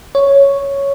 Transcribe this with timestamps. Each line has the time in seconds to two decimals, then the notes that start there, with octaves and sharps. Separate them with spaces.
0.15 C#5